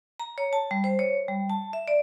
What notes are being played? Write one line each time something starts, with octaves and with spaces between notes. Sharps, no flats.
A#5
C#5
A5
G3
C5
C#5
G3
A5
E5
D5